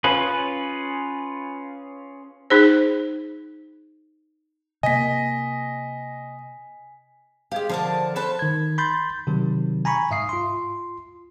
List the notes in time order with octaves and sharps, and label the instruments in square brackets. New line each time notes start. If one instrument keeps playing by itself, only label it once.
[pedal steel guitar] C#4 F4 G#4 B4
[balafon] D#4 G#4 C5
[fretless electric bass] C3 A#3 [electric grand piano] D#5 [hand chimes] G#5 B6
[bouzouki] G#3 G4 [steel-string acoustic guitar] F5
[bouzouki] D3 A#4 A5 [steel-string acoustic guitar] F3
[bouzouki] A4 B4 C5
[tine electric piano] D#3 G#6
B5 C6 G6 A6
C3 D#3 F#3
G#5 A#5 B5 C#6
G#2 E5 F5 D#6 C7
F4 C6